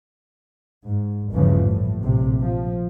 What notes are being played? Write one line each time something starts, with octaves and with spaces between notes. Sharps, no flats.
G#2
G1 D#2 C#3 E3 F3
A2
A#1 C3
F3